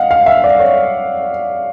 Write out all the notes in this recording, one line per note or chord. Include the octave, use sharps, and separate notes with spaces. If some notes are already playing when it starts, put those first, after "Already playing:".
Already playing: D#5 F5 F#5
F5
E5
D5
C#5